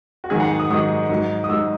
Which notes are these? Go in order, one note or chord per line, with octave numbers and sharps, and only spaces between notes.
F#4
G#2 D#3 F#3 G#4
F#5
D#6
G#2 D#3 F#3 D#6
G#2 F#3
D#6
G#2 F#3 E6